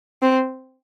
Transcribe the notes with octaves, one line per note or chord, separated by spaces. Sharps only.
C4